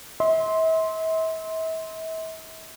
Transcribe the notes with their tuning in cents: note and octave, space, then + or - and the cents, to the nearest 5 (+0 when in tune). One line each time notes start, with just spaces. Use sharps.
E5 -40 C6 +0